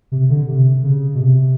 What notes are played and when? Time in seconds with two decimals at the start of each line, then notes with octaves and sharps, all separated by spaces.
0.12 C3
0.30 D3
0.48 C3
0.84 C#3
1.15 B2
1.20 C3